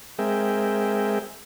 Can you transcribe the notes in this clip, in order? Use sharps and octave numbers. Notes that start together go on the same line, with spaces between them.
G#3 C4 G#4 A#4 E5 G5